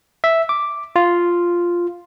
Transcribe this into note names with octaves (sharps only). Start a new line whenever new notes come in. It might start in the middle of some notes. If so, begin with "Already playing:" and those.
E5
D6
F4